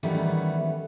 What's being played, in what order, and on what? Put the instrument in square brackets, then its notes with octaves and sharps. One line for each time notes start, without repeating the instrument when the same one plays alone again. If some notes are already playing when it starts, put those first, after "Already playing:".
[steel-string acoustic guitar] D#3 E3 G3 A3 B3 C#4